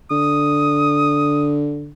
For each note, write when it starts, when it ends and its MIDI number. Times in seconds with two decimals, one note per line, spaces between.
0.11 1.92 50
0.11 1.54 87